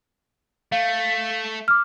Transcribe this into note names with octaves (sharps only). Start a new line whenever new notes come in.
A3 F5
D6 F6